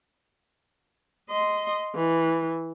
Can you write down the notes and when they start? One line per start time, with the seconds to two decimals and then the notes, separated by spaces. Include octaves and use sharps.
1.30 D#5 C6
1.95 E3